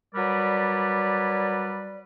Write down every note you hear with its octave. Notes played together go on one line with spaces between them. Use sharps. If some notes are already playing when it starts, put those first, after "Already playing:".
F#3 G3 A#4 B4 D5